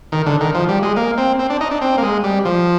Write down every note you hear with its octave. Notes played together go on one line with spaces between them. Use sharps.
D#3
D3
D#3
F3
G3
G#3
A#3
C4
C4
D4
D#4
D4
C4
A#3
G#3
G3
F3